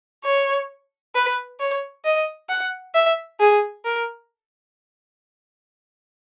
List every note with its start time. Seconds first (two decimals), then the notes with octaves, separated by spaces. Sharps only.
0.25 C#5
1.15 B4
1.60 C#5
2.05 D#5
2.49 F#5
2.95 E5
3.40 G#4
3.85 A#4